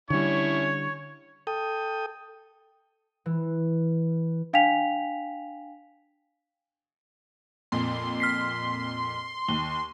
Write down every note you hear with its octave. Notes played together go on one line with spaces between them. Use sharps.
D3 G3 C#4 E4 C#5
A4 G5 D#6
E3
D4 F5 G5 G#5 B6 F7
F2 A#2 C6
F6 B6 C7
D#2 G7